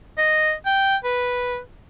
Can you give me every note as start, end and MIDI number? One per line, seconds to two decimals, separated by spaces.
0.18 0.52 75
0.66 0.96 79
1.04 1.59 71